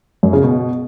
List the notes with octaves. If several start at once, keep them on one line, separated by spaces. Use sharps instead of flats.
F#2
C#3
B2